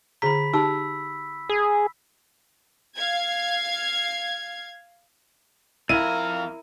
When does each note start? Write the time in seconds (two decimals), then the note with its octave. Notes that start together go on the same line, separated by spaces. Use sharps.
0.22 D3 G#4 A#5 B5 B6
0.54 D#4 G4 A5 E6
1.50 G#4
2.97 F5 G#6
5.89 F2 E4 A#4 F5 D#7